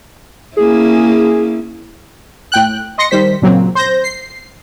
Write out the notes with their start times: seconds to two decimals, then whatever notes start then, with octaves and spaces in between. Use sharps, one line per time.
0.57 A#3 C#4 E4 G#4
2.52 A2 G5 F#6
2.98 D#5 C6 A#6 C#7
3.11 D#3 G3 C5 B6
3.42 A#2 C#3 F#3 A#3 C4
3.75 C5 G6 A#6
4.04 C7